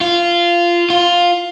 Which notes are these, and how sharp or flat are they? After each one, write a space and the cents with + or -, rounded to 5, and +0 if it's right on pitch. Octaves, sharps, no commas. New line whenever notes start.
F4 -15
F4 +5